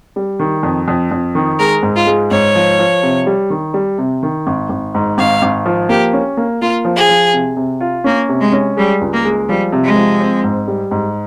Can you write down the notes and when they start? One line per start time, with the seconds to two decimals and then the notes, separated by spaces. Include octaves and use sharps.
0.16 G3
0.39 D#3
0.63 F2
0.88 F2
1.11 F2
1.35 D#3
1.59 G#3 A#4
1.83 G#2
1.96 F4
2.07 G#3
2.31 G#2 C#5
2.55 F3
2.78 F3
3.03 C3
3.26 G3
3.50 D#3
3.74 G3
3.98 C3
4.23 D#3
4.47 G#1
4.70 G#1
4.95 G#2
5.18 G#1 F5
5.42 G#1
5.66 F3
5.89 A#3 G4
6.13 C#4
6.37 A#3
6.61 A#3 F4
6.85 F3
6.97 G#4
7.09 F3
7.33 C3
7.56 C3
7.81 F4
8.04 A#3 C#4
8.29 C3
8.41 G#3
8.52 C#4
8.77 G3 G#3
9.01 C#2
9.12 A#3
9.25 G#3
9.48 F3 G3
9.72 C3
9.84 G#3
9.96 F3
10.21 C4
10.43 G#2
10.67 G3
10.91 G#2